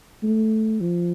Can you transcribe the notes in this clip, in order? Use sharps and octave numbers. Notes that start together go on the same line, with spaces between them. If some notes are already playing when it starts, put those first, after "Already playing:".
A3
F3